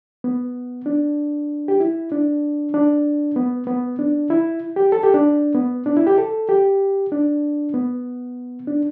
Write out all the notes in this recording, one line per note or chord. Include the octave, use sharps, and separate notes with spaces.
B3
D4
G4
E4
D4
D4
B3
B3
D4
E4
G4
A4
G4
D4
B3
D4
E4
G4
A4
G4
D4
B3
D4